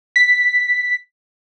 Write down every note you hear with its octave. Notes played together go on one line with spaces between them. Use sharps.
B6